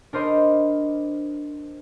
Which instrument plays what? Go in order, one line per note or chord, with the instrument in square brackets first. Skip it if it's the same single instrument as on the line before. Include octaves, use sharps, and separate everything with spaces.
[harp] D4 A#4 C5 D#5 B5